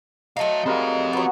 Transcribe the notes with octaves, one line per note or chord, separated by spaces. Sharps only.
F#3 A3 D#4 F5 A5
G3 G#3 C4 A#4 F5
F#3 B3 F4 C#5 F#5